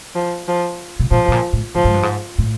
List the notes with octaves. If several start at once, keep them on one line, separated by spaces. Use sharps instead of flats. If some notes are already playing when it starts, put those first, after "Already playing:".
F3
F3
B2
A#2 F3
A2
A#2
A2
A2 F3
G#2
G2
G#2
A2